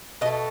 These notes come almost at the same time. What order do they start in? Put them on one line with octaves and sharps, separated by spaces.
B2 D#5 A3